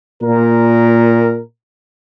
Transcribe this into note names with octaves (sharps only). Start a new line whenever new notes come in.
A#2 A#4